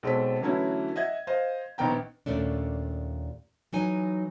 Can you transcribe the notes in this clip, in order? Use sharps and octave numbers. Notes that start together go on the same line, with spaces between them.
B1 G#3 C4 A4 B6
D3 E3 F#3 A3 C#4 E4
D#5 E5 F#5 G#6
C5 D#5 F5
A#1 D#3 B3 G5 A#5
D#2 A#2 A3 C#4 D4
E3 F#3 D#4 G#5